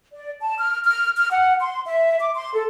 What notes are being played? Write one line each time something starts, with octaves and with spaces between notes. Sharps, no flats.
D5
A5
F6
F6
F6
F#5
C6
E5
D6
C6
A4